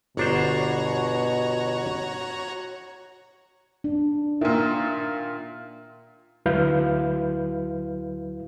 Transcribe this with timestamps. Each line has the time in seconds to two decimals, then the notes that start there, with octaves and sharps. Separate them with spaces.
0.17 G1 B2 D4 F#4 C5 C#5 A#5
3.84 D4
4.41 A#2 D#3 E5
6.46 D2 F#3 E4 B4 F5 G6